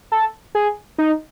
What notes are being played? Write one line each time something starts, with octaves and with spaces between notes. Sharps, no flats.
A4
G#4
D#4